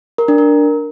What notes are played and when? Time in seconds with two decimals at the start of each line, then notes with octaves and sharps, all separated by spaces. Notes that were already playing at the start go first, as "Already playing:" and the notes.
0.18 A#4
0.28 D4
0.38 A#4